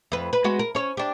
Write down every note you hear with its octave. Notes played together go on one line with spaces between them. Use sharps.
F2 B4
B4
G#3 B3 F#4
A#4
C#4 C#5
D4 G4